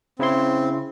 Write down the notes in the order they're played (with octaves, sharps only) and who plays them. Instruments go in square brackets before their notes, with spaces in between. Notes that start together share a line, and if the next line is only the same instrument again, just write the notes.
[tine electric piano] C#3 E4 C6 [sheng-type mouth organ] C4